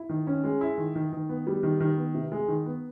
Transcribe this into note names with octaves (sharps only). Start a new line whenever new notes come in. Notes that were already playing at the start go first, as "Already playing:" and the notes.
Already playing: E4
D#3
C#4
G#3
E4
D#3
D#3
D#3
B3
G3
D#3
D#3
B3
C3
G#3
D#3
B3